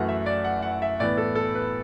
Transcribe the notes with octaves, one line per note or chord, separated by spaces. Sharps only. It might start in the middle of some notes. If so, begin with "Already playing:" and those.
Already playing: F#2 E3 A3 F#5
E5
D5
F#5
F#5
E5
A2 E3 B3 D5
A4
A4
B4